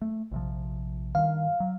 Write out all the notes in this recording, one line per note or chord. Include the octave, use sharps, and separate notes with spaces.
A3
A#1 C3 F3
G2 D#3 F5
F#3